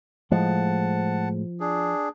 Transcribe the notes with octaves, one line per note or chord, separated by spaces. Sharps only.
A2 F3 G#3 F#5 A5
D4 G#4